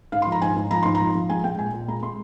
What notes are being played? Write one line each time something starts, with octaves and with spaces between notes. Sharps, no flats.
G#2 F5
C6
F3
A#5
G#2 G#5
G#2
F3 A#5
G#2 C6
A#5
F3
F3
G#3 G#5
G#3 G5
A#2 G#5
A#2
G#3 A#5
G#3 C6